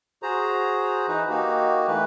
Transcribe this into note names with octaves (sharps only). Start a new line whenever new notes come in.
F#4 G#4 C5 A#5
E3 D#4 B4
A#3 D#4 F#4 G4
E3 A3 B4